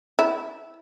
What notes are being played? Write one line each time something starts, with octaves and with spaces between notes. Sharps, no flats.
E4